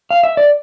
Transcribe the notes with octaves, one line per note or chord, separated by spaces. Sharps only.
F5
E5
D5